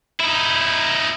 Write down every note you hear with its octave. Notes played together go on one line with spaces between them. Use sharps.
D#4 E4